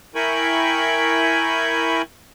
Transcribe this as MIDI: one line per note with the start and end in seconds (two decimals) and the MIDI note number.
0.15 2.02 64
0.15 2.02 70
0.15 2.02 79
0.15 2.02 80
0.15 2.02 83
0.15 2.02 85